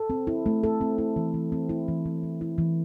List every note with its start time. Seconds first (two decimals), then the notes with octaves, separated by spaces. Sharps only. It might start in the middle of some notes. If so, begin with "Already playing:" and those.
Already playing: A4
0.10 C4
0.27 E4
0.46 A3
0.63 A4
0.81 C4
0.98 E4
1.16 E3
1.34 E3
1.52 C4
1.69 E4
1.88 E3
2.05 E3
2.23 C4
2.41 E4
2.58 E3